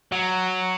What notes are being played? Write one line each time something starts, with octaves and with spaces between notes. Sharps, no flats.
F#3